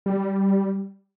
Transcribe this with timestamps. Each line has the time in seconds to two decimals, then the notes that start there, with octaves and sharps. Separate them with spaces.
0.06 G3